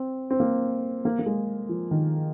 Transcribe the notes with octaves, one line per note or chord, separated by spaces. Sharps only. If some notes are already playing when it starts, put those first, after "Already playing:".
Already playing: C4
C4
A#3
A#3
A#3
G#3
F3
D#3